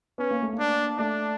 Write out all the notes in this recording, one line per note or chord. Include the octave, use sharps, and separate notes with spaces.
B3 C#4
A#3
A3
A#3
D4
A3 D4